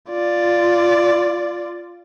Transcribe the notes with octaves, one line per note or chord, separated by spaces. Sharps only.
F4 D5